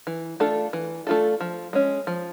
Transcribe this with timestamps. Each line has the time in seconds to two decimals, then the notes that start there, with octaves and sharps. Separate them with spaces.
0.07 E3
0.40 A3 D4 F4 A4
0.73 E3
1.07 A3 D4 F4 A4
1.41 F3
1.73 G#3 C#4
2.07 F3